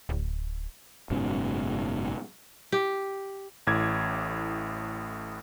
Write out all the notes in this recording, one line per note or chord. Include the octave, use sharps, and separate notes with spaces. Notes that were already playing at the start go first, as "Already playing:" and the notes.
D1
F#1 G#2 B2 C#4
G4
A1 A2 D6 G#6